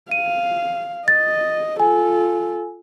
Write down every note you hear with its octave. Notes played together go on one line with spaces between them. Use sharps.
F5 D#7
D#5 A6
F4 A4 G#5